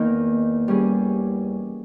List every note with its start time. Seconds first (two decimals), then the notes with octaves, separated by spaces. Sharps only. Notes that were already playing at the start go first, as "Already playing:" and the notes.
Already playing: E2 D#3 A#3 D#4
0.68 G3 C#4 G#4